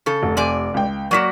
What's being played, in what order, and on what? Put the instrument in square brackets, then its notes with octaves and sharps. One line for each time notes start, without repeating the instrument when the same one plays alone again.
[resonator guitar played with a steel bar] C#3 A4
[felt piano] F1
[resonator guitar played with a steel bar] C3 D5 G#5
[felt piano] C#2 G5
[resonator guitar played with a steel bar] F#3 A#3 F#4 [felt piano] D5 B6 E7